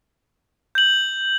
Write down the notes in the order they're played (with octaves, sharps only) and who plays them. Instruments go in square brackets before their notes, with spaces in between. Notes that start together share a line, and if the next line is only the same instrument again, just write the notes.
[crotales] G6 F#7